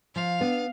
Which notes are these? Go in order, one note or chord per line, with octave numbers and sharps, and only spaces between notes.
F3 F5
B3 D4